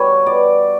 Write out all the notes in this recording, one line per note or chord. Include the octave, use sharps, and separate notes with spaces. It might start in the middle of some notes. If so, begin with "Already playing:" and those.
Already playing: B2 G3 G4 B4 C#5
B2 D5